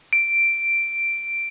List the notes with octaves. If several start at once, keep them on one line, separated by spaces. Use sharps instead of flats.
D7